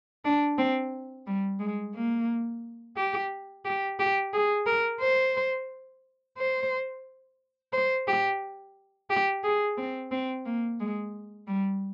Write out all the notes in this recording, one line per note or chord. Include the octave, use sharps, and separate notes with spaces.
D4
C4
G3
G#3
A#3
G4
G4
G4
G#4
A#4
C5
C5
C5
G4
G4
G#4
C4
C4
A#3
G#3
G3